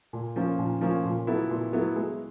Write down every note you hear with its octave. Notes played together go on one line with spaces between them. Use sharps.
A#2
F3 A#3 C#4 F4
A#2
F3 A#3 C#4 F4
A#2
F#3 B3 E4 A4
A#2
F#3 B3 E4 A4
G#3